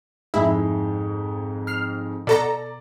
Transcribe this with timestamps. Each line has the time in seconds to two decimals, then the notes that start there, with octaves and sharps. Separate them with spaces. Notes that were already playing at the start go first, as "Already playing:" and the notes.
0.34 F2 G#2 G#3 E4 E5
1.67 F6 C7
2.27 B2 A4 D5 A#5